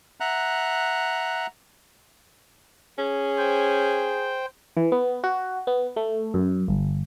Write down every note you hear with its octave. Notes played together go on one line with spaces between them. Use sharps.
E5 F#5 A#5 F#6
C#4 G#4
C5 G5
E3
B3
F#4
B3
A3
F#2
G1